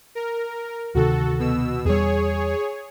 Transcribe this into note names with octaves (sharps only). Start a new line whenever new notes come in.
A#4
D2 C3 D#3 F#4 A4
B2 E6
E2 G3 G#4 C#5